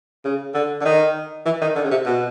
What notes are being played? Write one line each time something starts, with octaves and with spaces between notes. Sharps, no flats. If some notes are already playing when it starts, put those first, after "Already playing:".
C#3
D3
D3
D#3
E3
D#3
D3
C#3
C3
B2